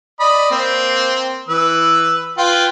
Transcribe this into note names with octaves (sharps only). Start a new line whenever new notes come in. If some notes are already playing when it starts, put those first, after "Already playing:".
D5 D#5 B5
A#3 C4
E3 B4 E6
F4 B4 G5